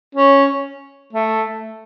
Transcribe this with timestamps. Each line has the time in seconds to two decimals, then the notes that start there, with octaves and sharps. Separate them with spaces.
0.15 C#4
1.13 A3